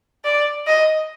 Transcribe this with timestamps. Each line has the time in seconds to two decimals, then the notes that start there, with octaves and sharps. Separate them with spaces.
0.24 D5
0.67 D#5